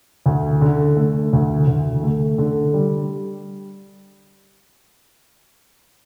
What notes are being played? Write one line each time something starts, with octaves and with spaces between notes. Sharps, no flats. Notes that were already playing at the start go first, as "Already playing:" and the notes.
D2
D3
A3
D2
D2
A3
D3
G3